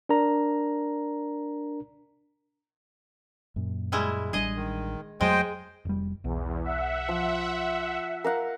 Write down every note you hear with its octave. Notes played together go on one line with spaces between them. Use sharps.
D4 A#4 A#5
F#2 A#2
G3 G#3 E4
A1 G3 D4 G#4 D#5
D#3
F2 F#3 G#3 A3 C5 D#5 G5
F1 G3
B1 E2
E5 F#5
F3
A#4 F5 F#5